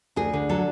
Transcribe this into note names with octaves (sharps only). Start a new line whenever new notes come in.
D2 G#4
D3
F#3 A4